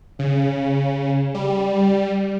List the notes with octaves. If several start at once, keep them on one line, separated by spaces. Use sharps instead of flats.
C#3
G3